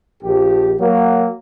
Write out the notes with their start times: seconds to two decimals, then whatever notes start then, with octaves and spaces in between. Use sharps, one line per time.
0.23 A#1 F3 G4
0.79 F#3 A#3